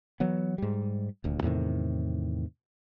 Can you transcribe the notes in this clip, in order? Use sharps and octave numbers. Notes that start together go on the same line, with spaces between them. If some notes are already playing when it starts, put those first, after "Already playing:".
E3 F#3 B3
G#2 G3
D#1 D2
E2 A2 C3 D#3